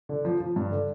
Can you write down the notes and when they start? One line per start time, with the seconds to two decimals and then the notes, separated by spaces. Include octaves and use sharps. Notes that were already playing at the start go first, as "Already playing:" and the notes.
0.09 D3
0.25 F3
0.41 F3
0.56 G2
0.71 D3